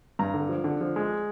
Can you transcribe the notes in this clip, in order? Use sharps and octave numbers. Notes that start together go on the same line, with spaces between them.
G2 A#5
D3
F3
D3
F3
G#3